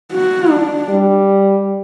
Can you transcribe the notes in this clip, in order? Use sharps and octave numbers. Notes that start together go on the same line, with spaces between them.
F#4
D4
G3